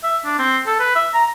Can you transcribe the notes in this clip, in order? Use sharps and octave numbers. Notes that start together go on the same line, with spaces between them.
E5
D4
C4
A4
B4
E5
A#5